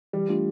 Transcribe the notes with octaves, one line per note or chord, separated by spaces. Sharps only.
E3 G3
A3 D4 F4